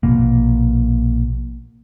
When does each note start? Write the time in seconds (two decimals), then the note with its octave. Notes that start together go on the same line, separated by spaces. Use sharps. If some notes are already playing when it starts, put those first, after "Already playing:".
0.03 A#1 B2 A#3